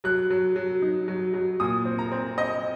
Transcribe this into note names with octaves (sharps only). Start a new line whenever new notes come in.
F#3 F#6
F#3
F#3
D#4
F#3
F#3
A#2 D#6
C4
A#5
C4
C4 D#5